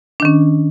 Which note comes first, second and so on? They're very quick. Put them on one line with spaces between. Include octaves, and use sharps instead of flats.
D4 D#3 C#4